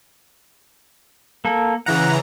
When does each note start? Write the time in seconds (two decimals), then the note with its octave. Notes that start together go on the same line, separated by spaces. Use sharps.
1.45 A#3 A4
1.86 C#3 E3 F#5 A#5